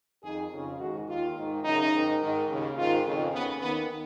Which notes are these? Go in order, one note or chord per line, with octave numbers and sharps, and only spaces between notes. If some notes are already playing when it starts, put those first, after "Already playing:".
F2 D#3 G#4
F2 C#3
G#2 D#3 F#4
D#2 D#3 F4
G#2 D#3
F#2 C#3 D#4
G#2 D#3
G#2 D#3
D#2 C#3
G#2 D#3 F4
F2 C#3
D#2 C#3 B3
D#2 D#3 B3